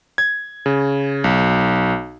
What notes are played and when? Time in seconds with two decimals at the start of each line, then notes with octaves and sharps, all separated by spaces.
0.18 G#6
0.66 C#3
1.24 B1